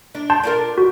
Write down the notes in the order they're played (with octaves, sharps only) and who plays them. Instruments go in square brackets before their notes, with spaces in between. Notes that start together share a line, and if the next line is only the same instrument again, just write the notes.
[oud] D4
[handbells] A5 C6 G6
[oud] D4 F4 A#4
[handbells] F#4